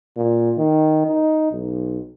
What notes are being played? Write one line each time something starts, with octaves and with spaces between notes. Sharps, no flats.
A#2
D#3
D#4
B1